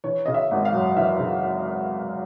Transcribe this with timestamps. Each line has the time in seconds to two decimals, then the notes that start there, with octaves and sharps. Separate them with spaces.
0.04 E3 C#5
0.26 C#3 D#5
0.34 E5
0.51 G#1
0.65 F5
0.73 F#2
0.97 E3 E5
1.19 C#3